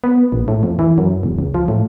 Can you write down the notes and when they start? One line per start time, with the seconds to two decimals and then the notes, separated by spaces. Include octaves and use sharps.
0.04 B3
0.32 A#1
0.48 A2
0.63 F2
0.79 E3
0.98 F#2
1.23 E1
1.39 C#2
1.54 F3
1.68 A2